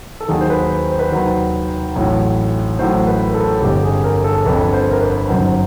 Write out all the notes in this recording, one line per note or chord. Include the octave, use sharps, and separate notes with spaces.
A4
D#2 D#3 F#3 G#4
C5
B4
C5
C5
B4
D#2 D#3 F#3 C5
A1 A2 F#3
A1 A2 F#3 C5
B4
A#4
A4
G1 F2 D3 G4
G#4
A#4
A4
G1 F2 D3 B4
C5
A#4
B4
G1 F#2 D#3 F#3 C5